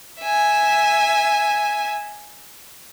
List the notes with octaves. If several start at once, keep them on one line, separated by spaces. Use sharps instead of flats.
E5 G#5